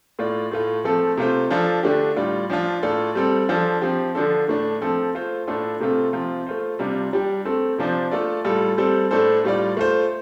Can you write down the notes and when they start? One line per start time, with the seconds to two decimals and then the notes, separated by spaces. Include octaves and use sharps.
0.19 A2 A3 F4 D5
0.51 A2 A3 F4
0.84 F3 A3 C4 A4
1.17 C3 A3 F4 C5
1.50 F3 D4 F4 A4
1.83 D3 A3 D4 G4
2.16 A2 G3 F4 D5
2.50 F3 D4 F4
2.83 A2 A3 F4 A4 D5
3.15 G3 C4 A4
3.49 F3 D4 F4 A4
3.82 F3 C4 G4
4.15 D3 F3 D4 A4
4.48 A2 A3 D4
4.81 F3 C4 A4
5.15 A3 F4 C5
5.47 A2 A3 D4 F4 A4
5.80 C3 A3 C4 F4 A4
6.13 C3 F3 C4 F4
6.47 A3 F4 C5
6.79 C3 G3 D4 F4
7.13 G3 D4 G4
7.45 A3 C4 A4
7.78 C3 F3 D4 F4 C5
8.12 A3 F4 A4 D5
8.45 A2 G3 F4 A4
8.78 G3 C4 A4 C5
9.11 A2 A3 D4 A4 C5
9.44 A2 G3 F4 D5
9.77 A3 F4 C5